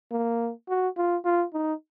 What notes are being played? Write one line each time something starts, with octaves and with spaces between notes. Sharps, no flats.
A#3
F#4
F4
F4
D#4